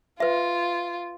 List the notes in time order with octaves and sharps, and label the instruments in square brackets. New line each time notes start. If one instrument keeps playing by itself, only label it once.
[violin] F4 [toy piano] B4 E5